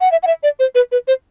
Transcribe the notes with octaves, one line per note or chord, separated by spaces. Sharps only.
F#5
E5
F#5
E5
D5
C5
B4
B4
C5